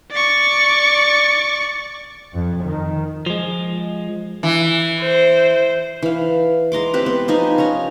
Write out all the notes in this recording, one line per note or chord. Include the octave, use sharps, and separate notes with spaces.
D5 C#6
F2
D#3
F3 G#3
E3
C5
E3 F5
G#3 A#5 C6 D6
C4 G4 B4
B3
F3 D#4 G4 G#5
C#4 C#5 G#5 A#5